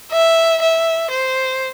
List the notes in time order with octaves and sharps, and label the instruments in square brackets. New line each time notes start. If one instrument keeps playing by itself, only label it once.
[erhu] E5
E5
C5